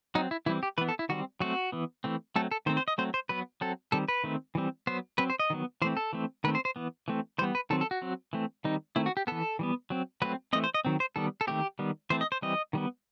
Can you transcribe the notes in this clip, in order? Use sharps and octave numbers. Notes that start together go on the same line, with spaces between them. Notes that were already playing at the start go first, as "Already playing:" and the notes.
F#3 C4 D#4
E4
E3 G3 C4 E4
G4
E3 B3 B4
A4
E4
D#3 G3 C4 F#4
F#3 A3 C4 F#4
E3 B3
E3 A3 C4
F#3 A3 C4 A4
A4
D#3 A3 C4 C5
C5
D#5
F#3 A3 C4 C5
C5
F#3 B3 B4
F#3 C4 A4
D#3 G3 C4 A4
B4
D#3 A3 C4
E3 G3 C4
F#3 B3 C5
F#3 C4 B4
C5
D#5
D#3 F#3 B3
E3 A3 C4 C5
A4
E3 A3 C4
D#3 A3 C4 B4
C5
C5
E3 B3
E3 A3 C4
E3 G3 B3 C5
B4
D#3 F#3 C4 A4
A4
F#4
F#3 C4
E3 A3 C4
D#3 G3 C4 D#4
D#3 A3 C4 E4
F#4
G4
E3 B3 A4
E3 G3 B3
F#3 C4
F#3 A3 C4 B4
E3 A3 C4 D#5
C5
D#5
D#3 F#3 C4
C5
D#3 G3 B3 A4
A4
D#3 A3 C4 G4
D#3 G3 B3
E3 A3 C4 C5
D#5
C5
E3 G3 C4 D#5
D#3 G3 B3